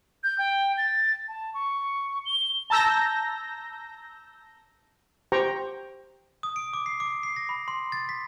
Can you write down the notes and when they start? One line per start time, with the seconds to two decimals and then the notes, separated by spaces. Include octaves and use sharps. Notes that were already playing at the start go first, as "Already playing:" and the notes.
0.24 G6
0.39 G5
0.78 A6
1.28 A5
1.54 C#6
2.26 G7
2.70 A5 A#5 E6 G6 A#6
5.32 G4 C5 G5 A#5 C#6
6.43 D#6
6.56 D7
6.73 D6
6.86 C7
7.00 D6
7.23 C7
7.36 A#6
7.49 B5
7.68 C6
7.92 A6
8.09 B6